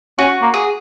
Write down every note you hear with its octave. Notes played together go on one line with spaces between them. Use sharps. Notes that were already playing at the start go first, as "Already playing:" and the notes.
C#4 F#4
A#3
G#4